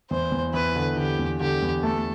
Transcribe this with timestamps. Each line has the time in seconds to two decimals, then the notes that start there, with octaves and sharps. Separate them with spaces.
0.10 E2 C5
0.32 E2
0.54 E2 B4
0.76 D3
0.97 D3 G4
1.19 E2
1.40 D3 G4
1.62 E2
1.83 A3 A4